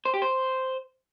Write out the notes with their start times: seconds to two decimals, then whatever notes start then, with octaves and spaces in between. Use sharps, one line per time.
0.05 C5
0.14 G4
0.22 C5